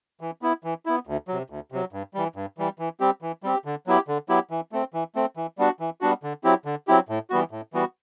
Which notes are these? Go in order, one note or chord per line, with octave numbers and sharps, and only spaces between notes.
E3
B3 E4
E3
B3 E4
D2
C3 F#3
D2
C3 F#3
G2
E3 G3
G2
E3 G3
E3
G3 C4 G4
E3
G3 C4 G4
D3
F#3 B3 E4 G4
D3
F#3 B3 E4 G4
E3
A3 C4
E3
A3 C4
E3
G3 B3 D4 F#4
E3
G3 B3 D4 F#4
D3
F#3 C4 E4 G4
D3
F#3 C4 E4 G4
A2
E3 G3 B3 F#4
A2
E3 G3 B3 F#4